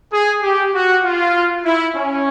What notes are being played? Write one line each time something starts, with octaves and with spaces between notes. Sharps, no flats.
G#4
G4
F#4
F4
E4
C#4